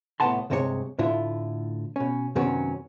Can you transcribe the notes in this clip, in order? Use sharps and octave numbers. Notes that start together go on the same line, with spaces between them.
C2 A2 B3 F#5 A5 C6
C#2 G2 C3 G#3 F4 C#5
A2 D3 E4 F4
B2 C#4
F#2 C3 D#3 F#3 B3 C#4